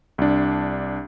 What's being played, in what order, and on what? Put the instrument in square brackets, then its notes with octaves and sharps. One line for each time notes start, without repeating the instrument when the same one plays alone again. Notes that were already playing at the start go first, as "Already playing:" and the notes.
[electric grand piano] C2 D4